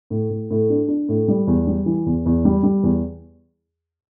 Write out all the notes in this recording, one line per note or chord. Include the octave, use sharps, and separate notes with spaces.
A2
A2
A2
D4
D4
A2
G3
E2
G3
E3
E2
E2
G3
G3
E2